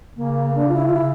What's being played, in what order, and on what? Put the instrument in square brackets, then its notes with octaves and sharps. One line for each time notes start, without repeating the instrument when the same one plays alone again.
[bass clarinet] C#3 [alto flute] A#3
[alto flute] D4
F4
E4
F4
[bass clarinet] C#3 [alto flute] E4